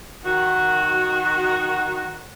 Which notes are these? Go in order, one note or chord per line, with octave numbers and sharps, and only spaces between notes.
D#3 F#4